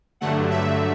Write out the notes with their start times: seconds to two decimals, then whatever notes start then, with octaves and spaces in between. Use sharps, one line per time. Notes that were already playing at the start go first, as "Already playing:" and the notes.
0.21 G2 D3 F#3 A3 F#5
0.50 E5